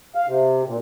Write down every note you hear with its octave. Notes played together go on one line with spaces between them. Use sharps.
F5
C3
A#2